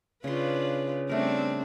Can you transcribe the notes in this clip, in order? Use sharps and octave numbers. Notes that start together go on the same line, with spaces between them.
C#3 D4 F4 B4 C6
G3 A3 C4 D4 A#4